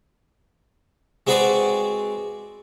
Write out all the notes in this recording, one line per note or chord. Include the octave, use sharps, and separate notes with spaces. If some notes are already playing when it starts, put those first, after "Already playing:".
G#3 C4 F#4 G#4 B4 D5